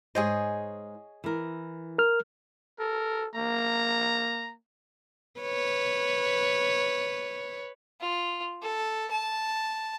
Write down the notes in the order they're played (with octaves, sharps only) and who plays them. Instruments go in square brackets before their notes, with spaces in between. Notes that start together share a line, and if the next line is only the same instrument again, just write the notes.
[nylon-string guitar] G#2 C5 [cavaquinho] G#4 C#5 D#5
[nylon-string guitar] E3 A#4
[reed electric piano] A#4 F6
[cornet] A4 [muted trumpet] A#4
[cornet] A#3 [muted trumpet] A#5
[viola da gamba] B4 C#5
[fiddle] F4
A4
A5